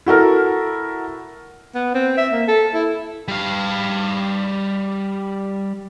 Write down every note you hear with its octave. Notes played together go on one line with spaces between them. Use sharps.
E4 F#4 A4 A#4
B3
C4
E5
A#3
A4
E4
G3 F5